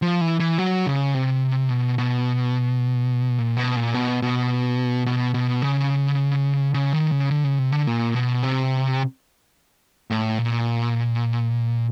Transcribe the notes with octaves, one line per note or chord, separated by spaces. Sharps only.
F3
E3
E3
F#3
C#3
C3
B2
B2
A#2
B2
A#2
B2
B2
B2
B2
C#3
C#3
D#3
C#3
D3
C#3
C3
D3
A#2
B2
C3
A2
A#2